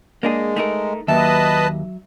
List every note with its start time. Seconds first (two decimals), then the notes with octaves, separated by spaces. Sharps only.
0.23 G#3 A#3 D4 G#4
0.56 A3 D#4 A#4
1.08 D#2 F#3 B4 D#5 E5 A5